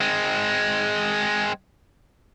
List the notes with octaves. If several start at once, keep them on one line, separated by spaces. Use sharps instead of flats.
G#3 C4